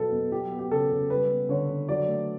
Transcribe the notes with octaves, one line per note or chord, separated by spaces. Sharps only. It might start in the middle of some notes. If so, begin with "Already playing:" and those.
Already playing: B2 F#3 B3 A4
B2
F#3 G4
B3
G4
C#3 A4
C#3
G3 B4
B3
D3 C#5
D3
F#3 D5
A3